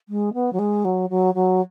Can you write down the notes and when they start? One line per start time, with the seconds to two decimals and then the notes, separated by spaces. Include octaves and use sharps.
0.08 G#3
0.33 B3
0.52 F#3
0.59 G#3
0.84 F#3
1.10 F#3
1.34 F#3